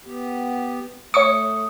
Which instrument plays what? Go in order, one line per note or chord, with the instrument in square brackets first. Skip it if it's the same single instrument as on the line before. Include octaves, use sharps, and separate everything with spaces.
[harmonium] B3 G4
[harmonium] A3 [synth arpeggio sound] C#5 C#6 C#7 [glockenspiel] D#6